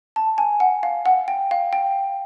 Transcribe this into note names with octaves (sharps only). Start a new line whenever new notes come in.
A5
G#5
F#5
F5
F#5
G5
F5
G5